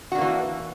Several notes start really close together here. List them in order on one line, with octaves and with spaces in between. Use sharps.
F#4 D4 A#3 E3